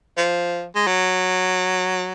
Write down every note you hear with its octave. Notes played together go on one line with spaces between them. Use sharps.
F3
G#3
F#3